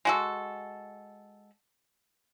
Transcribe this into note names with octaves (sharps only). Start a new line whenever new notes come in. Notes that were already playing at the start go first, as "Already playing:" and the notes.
G#3 F#4 A4